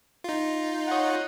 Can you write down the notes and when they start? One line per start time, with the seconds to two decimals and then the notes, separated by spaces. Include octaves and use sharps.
0.24 D#4 F4
0.88 C#5 D#5 F#5